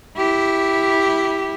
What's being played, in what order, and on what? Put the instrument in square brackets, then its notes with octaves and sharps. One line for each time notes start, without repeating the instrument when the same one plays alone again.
[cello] E4 G4